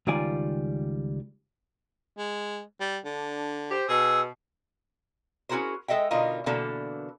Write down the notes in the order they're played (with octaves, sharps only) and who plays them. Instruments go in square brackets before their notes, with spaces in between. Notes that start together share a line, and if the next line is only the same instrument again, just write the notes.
[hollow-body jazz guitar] C#2 D#3 G3 F4 D5 G#5
[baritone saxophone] G#3
G3
[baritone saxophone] D3 [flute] D4
[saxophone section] G4 C5
[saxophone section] B2 [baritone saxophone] G#4 [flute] E6
[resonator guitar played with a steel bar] C#4 E4 F#4 G#4 A#4 C5
G#3 A4 D#5 E5 G5
B2 D3 D#4 F4 A#4 D#5
B2 D3 E3 A#3 A4